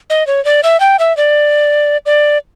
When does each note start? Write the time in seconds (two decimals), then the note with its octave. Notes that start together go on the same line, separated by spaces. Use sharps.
0.10 D#5
0.27 C#5
0.45 D5
0.63 E5
0.80 G5
0.99 E5
1.17 D5
2.06 D5